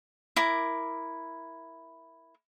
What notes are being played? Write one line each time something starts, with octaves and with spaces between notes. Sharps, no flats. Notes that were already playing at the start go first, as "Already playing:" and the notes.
E4 A#4 D6